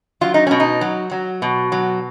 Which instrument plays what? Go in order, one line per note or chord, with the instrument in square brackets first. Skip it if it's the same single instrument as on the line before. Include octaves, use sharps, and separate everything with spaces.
[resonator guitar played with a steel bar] F#3 F4
D#4
B2 C#4
D#4
F#3
F#3
B2
F#3